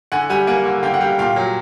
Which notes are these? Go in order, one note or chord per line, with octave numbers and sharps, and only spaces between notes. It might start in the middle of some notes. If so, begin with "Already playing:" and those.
D3 F#5 G#5
G3 F#5 G#5
A#3 F#5 G#5
D3
D3 F5 G5
F#5
G3 F5 G5
A#2 F5 G5
F#3